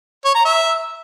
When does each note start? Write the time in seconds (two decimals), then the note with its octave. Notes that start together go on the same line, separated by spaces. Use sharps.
0.25 C#5
0.35 A#5
0.45 E5